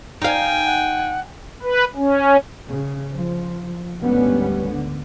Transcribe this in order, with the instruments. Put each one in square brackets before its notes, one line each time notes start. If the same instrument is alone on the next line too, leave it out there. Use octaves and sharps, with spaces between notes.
[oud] D#4 F5 [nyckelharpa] G5 G#5
[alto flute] F#5
[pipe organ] B4
C#4
[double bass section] C#3
F3
G#1 D2 G3 B3 C#4
D3